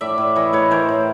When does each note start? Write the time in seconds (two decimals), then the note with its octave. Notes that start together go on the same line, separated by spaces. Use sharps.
0.01 A2 D5 E5
0.18 A2
0.35 E3 C#5 D#5
0.53 A2 B4 C#5
0.71 E3 A#4 C5
0.89 A2